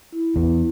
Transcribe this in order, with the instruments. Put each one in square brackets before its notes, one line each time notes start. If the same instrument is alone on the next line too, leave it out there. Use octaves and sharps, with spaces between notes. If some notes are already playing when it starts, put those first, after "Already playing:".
[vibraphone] E4
[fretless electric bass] E2 [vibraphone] E4